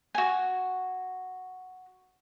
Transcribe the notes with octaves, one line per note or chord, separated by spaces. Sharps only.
F#4 G#5